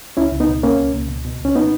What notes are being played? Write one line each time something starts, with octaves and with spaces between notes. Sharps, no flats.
C#2 C#4 E4
C#2
B3 D#4
B2
B2 A#3 C#4
C#2
C#2
B2
B2
C#2 C#4
B3 D#4